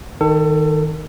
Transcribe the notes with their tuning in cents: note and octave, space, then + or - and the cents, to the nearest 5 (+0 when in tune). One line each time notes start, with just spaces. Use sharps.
D#3 +0 A4 +30